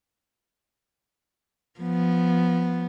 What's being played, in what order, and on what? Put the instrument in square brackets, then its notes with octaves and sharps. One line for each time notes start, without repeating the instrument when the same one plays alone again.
[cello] F3 B3